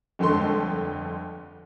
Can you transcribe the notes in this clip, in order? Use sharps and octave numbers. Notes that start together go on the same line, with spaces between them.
G1 F2 D3 G#3 A4 C6